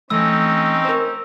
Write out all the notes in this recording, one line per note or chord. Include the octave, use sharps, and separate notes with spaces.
E3 A3 C4 C#4 D#4 B5 E6
A#4 C5